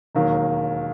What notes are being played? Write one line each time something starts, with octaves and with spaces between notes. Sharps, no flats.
E1 D#2 D#3 F#3